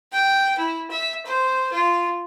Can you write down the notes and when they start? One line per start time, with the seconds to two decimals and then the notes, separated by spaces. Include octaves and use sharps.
0.12 G5
0.58 E4
0.90 E5
1.25 C5
1.72 F4